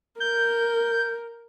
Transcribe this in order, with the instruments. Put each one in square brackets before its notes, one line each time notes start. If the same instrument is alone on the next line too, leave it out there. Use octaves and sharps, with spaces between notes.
[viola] A#4 [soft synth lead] G6